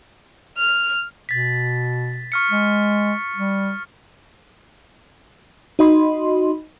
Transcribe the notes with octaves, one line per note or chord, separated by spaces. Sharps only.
F6
B2 A6 B6
C#6 F6 C#7
G#3
G3
D#4 F#4 D#5 B5 C6